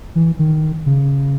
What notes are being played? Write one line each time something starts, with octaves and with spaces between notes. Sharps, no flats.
E3
D#3
C#3